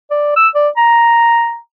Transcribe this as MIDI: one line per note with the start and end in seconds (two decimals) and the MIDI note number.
0.11 0.33 74
0.36 0.48 88
0.55 0.69 74
0.77 1.57 82